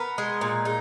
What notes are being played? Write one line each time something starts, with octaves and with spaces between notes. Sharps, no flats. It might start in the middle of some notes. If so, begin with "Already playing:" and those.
Already playing: B3 A#4
G#3
A#2
D#4